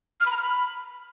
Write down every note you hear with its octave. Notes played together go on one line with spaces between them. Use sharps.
F6
B5
A#5
F6
B5